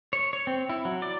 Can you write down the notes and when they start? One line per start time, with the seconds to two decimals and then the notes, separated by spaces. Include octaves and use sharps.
0.13 C#5
0.33 C#5
0.47 C4
0.69 E4
0.85 F#3
1.02 D5